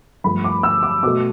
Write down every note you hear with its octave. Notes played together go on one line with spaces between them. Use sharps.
G2 F3 A3 B5
D6
E6
D6
B2 A3 D6